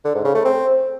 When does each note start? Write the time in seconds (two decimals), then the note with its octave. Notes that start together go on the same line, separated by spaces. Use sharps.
0.05 D3
0.15 G#2
0.25 C#3
0.35 A3
0.45 C4